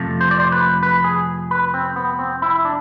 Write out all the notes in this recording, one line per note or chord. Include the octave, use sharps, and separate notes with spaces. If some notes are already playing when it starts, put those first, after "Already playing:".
Already playing: F2 C3 F3 A3
C5
D5
C5
B4
B4
G#4
B4
C4
B3
C4
E4
D4